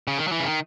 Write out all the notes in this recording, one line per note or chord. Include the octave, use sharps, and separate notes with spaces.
C#3
D#3
F#3
E3
C#3
D#3